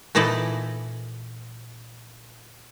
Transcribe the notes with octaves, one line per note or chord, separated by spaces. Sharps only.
A#2 E3 D#4 E4 A4 D5